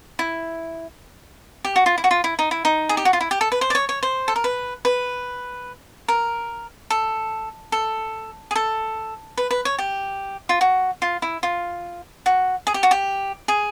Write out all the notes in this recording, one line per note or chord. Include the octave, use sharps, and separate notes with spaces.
E4
G4
F#4
F4
E4
F#4
F4
E4
D#4
E4
D#4
G#4
G4
F#4
F4
E4
G4
A4
B4
C5
D5
C#5
C#5
C5
A4
A#4
B4
B4
A#4
A4
A4
G#4
A4
B4
B4
C#5
G4
F4
F#4
F4
E4
F4
F#4
G#4
G4
F#4
G4
G#4